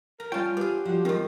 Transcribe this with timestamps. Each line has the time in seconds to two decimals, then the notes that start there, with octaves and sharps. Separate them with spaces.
0.20 A#4 A#5
0.32 G3 C#4 F4 G5 A5
0.57 B3 G4 G#4
0.85 F3 G3 F#4
1.05 F#2 D#3 G#3 C4